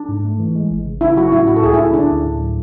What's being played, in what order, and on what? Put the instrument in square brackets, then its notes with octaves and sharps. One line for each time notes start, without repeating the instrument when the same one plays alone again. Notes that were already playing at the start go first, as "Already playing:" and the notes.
Already playing: [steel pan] D4
[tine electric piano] G#2
A3
E3
G#3
G#1
C#3
[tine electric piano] C#4 [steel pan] E4
[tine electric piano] F#3 [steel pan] F#4
[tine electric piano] A2 [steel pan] E4
[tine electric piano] A2 [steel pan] F#4
[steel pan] A4
[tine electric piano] C#2 [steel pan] G#4
[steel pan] E4
[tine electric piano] C#4
[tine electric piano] D3 [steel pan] D4
[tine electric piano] D2
A2
F#3